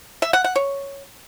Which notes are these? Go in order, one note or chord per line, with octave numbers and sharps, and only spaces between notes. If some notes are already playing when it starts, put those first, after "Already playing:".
E5
F#5
F#5
C#5